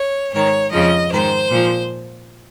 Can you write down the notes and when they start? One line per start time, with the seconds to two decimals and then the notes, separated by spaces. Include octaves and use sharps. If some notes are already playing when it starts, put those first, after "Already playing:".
Already playing: C#5
0.33 G#2 D#3 C#5
0.71 F2 C#3 F3 D#5
1.12 G#2 D#3 C5
1.51 A#2 F3